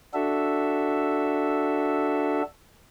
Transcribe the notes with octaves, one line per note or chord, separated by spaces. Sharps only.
D4 F#4 A4 E5